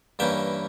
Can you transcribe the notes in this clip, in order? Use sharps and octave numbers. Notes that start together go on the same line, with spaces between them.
G2 E3 A#3 C#4 E5 G5